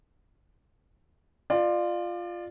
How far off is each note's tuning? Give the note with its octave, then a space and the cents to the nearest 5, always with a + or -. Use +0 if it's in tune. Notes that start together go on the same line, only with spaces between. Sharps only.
F4 +0 D5 +30